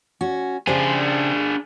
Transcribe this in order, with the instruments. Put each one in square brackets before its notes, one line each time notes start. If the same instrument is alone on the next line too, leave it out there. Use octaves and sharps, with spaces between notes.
[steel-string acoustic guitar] C#4 F#4
[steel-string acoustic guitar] C#3 G4 C5 [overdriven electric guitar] D4 G#4